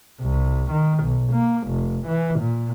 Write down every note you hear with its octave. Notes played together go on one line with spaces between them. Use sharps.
C2
D#3
B1
A#3
F1
E3
A#2